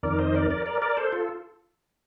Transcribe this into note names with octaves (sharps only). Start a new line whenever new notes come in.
F2 D#3 A#4 D5
C5 D#5
A#4 D5
A#4 D5
A#4 D5
A#4 D5
A4 C5
F4 A4